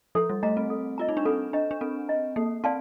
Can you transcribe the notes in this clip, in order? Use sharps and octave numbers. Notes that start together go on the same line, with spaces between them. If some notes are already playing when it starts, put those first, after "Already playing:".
F3 A4
G3
A3 D#5 A#5
C4
A4
F4 D#5 A#5
D#4
D4
C4 A4
D4 D#5 A#5
D4
C4 A4
D#5 A#5
A#3 A4
C4 D5 F5 A5 C6